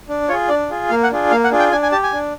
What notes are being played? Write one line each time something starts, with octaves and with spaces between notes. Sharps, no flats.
D4
F4 G#4 C#5
D4 D5
F4 G#4
A#3 F5
F#5
D4 F4 G#4
A#3 F5
F#5
D4 F4 G#4
G5
D4 G#5
G#5
G4 A5
G#5
D4